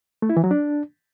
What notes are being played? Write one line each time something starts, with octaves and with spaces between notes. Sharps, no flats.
A3
E4
E3
F#3
D4